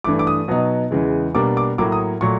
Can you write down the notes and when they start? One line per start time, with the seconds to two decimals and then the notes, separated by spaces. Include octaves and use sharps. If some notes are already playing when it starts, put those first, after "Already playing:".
0.04 G2 E3 A3 D6
0.19 D6
0.27 D#6
0.48 B2 F#3 B3 D#4
0.91 E2 C#3 E3 G#3
1.35 B2 G3 A#3 D4 D6
1.57 D6
1.78 A2 F#3 A#3 D6
1.92 D#6
2.21 A#2 F#3 A3 C#6